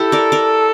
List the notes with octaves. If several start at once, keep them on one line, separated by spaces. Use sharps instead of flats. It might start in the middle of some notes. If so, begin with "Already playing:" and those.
Already playing: E4 G4 A4
A#4 D5
A#4 D5